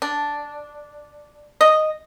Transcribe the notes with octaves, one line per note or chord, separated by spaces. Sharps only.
D4
D#5